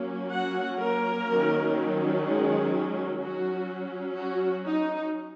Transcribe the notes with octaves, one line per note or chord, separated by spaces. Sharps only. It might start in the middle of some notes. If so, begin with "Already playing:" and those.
Already playing: F#3 A#3 C#4
F#4 F#5
A#3 A#4
D#3 F#3 C#4
G#3 G#4
F#3 C#4 F#4
F#4
D#4